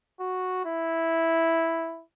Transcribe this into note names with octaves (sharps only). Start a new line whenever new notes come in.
F#4
E4